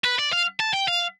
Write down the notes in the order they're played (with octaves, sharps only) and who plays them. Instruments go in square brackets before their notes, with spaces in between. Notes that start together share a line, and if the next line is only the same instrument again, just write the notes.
[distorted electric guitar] B4
D5
F5
A5
G5
F5